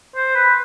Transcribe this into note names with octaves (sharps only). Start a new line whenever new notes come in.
C5
B4